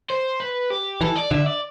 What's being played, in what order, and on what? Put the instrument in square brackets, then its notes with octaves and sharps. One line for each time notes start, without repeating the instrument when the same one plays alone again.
[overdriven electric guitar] C5
B4
G4
[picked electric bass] E3 [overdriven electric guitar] A4
[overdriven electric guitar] D5
[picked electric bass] D3 [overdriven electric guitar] E5
[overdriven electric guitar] D5